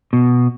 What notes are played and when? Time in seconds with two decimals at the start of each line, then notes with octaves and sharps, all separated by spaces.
0.13 B2